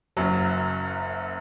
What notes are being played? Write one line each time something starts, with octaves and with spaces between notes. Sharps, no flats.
F#1 F#2 F#3